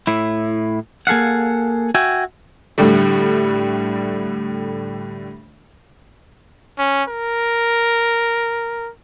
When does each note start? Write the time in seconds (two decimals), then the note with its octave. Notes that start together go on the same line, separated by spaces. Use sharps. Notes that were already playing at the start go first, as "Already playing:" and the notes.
0.07 A2 E4
1.07 A#3 G#4 A4 F5 F#5
1.95 F#4 E5 G5 G#5
2.78 A2 D3 G3 A3
6.79 C#4
7.09 A#4